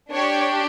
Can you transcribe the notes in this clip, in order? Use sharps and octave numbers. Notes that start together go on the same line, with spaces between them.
D4 G4 C#5